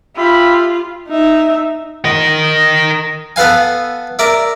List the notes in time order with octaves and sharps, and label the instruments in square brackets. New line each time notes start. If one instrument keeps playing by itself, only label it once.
[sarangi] F4 [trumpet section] G4 E5 B5
[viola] D#4 E5
[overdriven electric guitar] A#4 D#5
[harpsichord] B3 A4 B4 F5 G#5
A#4 D5 E5